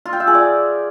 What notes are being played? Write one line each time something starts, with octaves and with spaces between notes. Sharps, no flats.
F4
G5
E5
G#4
D5